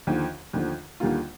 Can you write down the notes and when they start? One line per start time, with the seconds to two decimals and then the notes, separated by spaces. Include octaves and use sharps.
0.07 D#2 D3 F3
0.53 D#2 D3 F3
1.00 D#2 D3 G3 A#3 F4